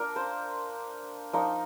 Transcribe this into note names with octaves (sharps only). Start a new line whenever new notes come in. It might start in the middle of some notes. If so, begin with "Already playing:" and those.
Already playing: A#3 D4 F4 A#4
C5
F3 A#3 D#4